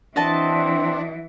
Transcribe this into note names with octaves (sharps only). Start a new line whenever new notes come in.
E3 C4 D4 F#4 D#5 A5